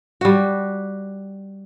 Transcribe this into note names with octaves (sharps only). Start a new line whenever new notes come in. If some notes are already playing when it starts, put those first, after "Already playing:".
G3 F#4